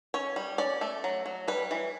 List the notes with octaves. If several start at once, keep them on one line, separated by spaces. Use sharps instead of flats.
C#4 C#5
G3
C#4 D5
A3
F#3
F#3
G3 B4
E3